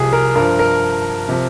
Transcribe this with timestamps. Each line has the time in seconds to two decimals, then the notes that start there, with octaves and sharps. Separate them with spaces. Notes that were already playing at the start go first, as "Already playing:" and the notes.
Already playing: C2 C3 F3 G4 G#4
0.13 A#4
0.35 G2 F3 A#4
0.59 A#4
1.29 C3 F3